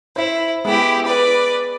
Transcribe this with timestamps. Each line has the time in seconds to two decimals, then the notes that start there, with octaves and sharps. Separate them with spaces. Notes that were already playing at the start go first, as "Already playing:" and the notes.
0.16 E4 C5 E5
0.65 G#3 B3 E4 G4
1.04 B4 D5